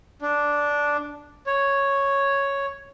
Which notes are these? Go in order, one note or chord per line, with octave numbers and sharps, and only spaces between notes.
D4
C#5